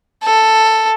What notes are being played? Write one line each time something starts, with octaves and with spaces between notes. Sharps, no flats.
A4